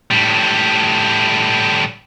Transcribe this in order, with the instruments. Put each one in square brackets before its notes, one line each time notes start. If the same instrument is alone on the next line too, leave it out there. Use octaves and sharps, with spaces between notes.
[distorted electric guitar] A2 G3